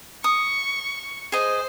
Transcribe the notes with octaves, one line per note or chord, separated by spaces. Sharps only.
C#6 D#6
G#4 C5 D#5